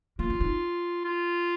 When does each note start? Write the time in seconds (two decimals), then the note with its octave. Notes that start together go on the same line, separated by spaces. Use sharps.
0.19 A#3 F4
0.30 C#4
0.40 D#4
1.05 F4